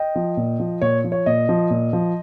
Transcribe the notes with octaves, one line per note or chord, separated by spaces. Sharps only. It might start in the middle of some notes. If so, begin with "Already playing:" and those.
Already playing: D#5 G5
F3
A#2
F3
A#2 C#5
F3
C#5
A#2 D#5
F3
A#2
F3